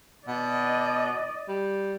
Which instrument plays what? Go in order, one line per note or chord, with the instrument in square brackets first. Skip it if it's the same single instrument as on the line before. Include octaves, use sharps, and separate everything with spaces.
[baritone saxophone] B2 [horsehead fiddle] D5 D#5
[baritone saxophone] G3